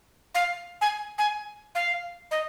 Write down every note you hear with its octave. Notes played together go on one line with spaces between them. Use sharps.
F5
G#5
G#5
F5
D#5